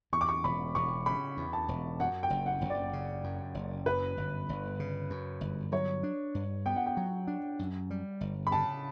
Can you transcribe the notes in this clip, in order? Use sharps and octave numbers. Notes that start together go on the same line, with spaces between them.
E2 C#6
D6
C#6
E1 B5
E1 C#6
C#3 B5
E2
A5
E1
F#2 F#5
G5
F#1
F#5
F#1
D5
C#3
F#2
F#1
F#2 B4
G1
G1
C#3
F#2
G1
F#3 C#5
D4
G2
B3 G5
F#5
G5
F#3
D4
F#2
G3
G1
B5
C#3 A5